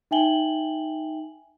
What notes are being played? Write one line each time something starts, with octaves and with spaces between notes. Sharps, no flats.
D#4 E5 G5 G#5 F#7 G7